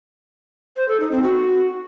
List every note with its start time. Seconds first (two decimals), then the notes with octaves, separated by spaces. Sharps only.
0.76 C5
0.88 A4
1.00 D#4
1.11 C4
1.23 F#4